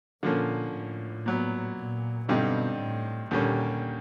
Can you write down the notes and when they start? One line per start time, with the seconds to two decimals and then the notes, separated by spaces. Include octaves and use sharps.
0.23 A#2 D3 F3 A#3 C#4
0.74 A2
1.26 A#2 F#3 B3
1.77 A#2
2.28 G2 B2 D3 G3 C4 D#4
2.79 A2
3.31 D#2 A#2 D3 G3 A#3 C#4